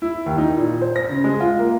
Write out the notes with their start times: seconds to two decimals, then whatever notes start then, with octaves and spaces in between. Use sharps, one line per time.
0.02 E4
0.26 D#2
0.38 D#4
0.57 A#2
0.82 C5
0.96 A#6
1.09 C#3
1.24 G#3
1.40 F4
1.59 A#3